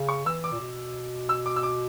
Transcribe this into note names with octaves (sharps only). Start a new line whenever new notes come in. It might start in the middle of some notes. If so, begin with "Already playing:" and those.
Already playing: C#3
C#6
E3 E6
D6
A#2
B2
E6
D6
E6
D6